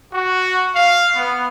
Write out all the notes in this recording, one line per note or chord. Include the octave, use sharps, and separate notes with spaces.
F#4
F5
B3